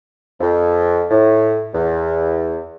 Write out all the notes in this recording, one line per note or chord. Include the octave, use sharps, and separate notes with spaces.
F2
A2
E2